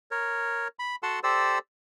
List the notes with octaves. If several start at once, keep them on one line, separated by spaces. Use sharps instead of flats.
A#4 C#5
B5
F#4 A4 F#5 A5 C6 E6
G4 A4 C5 D5 E6